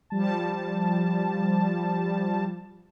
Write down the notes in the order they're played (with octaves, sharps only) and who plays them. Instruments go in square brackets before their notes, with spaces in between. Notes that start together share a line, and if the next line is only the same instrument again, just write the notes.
[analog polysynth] F3 G3 A5